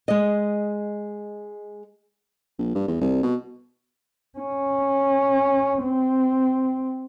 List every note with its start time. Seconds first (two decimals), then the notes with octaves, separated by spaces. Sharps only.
0.08 G#3 D#5
2.59 A#1
2.75 G2
2.88 E2
3.01 C2
3.23 B2
4.39 C#4
5.84 C4